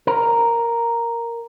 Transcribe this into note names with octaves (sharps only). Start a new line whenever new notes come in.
A#4